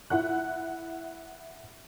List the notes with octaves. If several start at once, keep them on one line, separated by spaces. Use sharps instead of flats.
E4 F#5 F#6